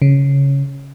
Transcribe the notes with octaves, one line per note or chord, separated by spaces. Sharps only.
C#3